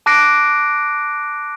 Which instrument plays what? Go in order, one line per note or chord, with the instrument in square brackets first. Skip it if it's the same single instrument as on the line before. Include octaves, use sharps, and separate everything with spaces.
[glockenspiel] A5 D6 F#6 A#6 C7 D7